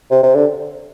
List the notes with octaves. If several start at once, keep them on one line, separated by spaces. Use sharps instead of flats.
C3
C3
D3